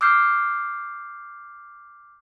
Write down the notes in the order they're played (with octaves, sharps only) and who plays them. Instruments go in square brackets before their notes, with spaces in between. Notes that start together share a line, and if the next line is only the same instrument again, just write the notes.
[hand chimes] D6 E6 F6 G6 C7